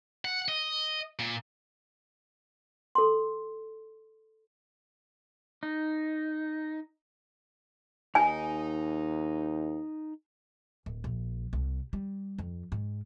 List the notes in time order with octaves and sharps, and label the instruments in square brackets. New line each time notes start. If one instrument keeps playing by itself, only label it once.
[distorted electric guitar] F#5
D#5
A#2
[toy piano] A4 C6
[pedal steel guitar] D#4
[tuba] D#2 [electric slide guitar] D#4 D#5 [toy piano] G#5
[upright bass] D1
A#1
C2
G3
F2
G#2